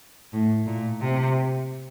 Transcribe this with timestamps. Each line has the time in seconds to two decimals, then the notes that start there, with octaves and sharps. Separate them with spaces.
0.33 A2
0.67 A#2
1.01 C3